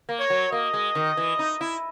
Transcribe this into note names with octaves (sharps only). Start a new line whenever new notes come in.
A#3
C#5
F#3
A#3 D#5
G#3
D#3
E3
D#4
E4